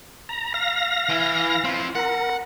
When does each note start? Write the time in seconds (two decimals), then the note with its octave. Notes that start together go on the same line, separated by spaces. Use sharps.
0.29 A#5
0.54 F5 A#6
1.09 E3
1.64 C4 F4
1.95 A#4 F#5